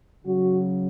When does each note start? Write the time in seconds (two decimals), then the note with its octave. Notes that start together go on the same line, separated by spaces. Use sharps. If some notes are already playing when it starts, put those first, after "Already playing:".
0.25 C#3 F#3 F#4